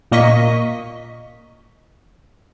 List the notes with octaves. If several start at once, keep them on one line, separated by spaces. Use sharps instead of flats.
A#2 A#3 D#5 C#6 B6